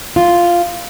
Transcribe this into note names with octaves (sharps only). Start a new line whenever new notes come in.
F4